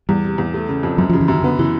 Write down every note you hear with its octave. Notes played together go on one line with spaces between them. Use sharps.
E2 G3
C3
E2
A3
C#3
F2
F#2 F#3
C#3 F3
E3
F#2 D#3
D3 B3
C#3 E3